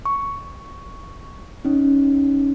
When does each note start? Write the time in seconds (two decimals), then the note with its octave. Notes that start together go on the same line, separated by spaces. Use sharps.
0.05 C#6
1.65 C#4 D#4